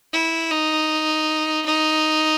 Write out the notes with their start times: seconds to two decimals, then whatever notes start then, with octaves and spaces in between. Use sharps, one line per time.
0.13 E4
0.51 D#4
1.65 D#4